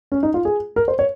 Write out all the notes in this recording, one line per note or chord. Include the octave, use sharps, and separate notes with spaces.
C#4
D#4
F4
G#4
A#4
C5
C#5